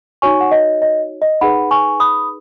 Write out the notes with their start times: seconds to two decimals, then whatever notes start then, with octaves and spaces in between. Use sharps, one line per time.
0.22 D#4 F#4 C#5 G#5 C#6
0.41 F#5
0.51 D#5
0.82 D#5
1.22 D#5
1.41 D#4 G#4 B4 F#5 B5
1.71 G#5 C#6
2.00 B5 D#6